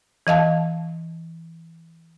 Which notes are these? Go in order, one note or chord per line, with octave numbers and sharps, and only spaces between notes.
E3 D#5 F5 A5